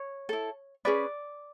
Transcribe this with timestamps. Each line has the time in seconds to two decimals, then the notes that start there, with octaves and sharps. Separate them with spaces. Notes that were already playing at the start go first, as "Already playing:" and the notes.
Already playing: C#5
0.29 E4 A4
0.85 C#4 G#4 B4 D5